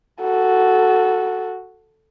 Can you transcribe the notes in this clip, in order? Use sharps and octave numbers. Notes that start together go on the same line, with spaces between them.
F#4 A4